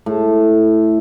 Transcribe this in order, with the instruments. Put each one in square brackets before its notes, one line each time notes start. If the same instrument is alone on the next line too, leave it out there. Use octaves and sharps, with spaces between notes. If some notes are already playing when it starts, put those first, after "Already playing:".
[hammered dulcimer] A2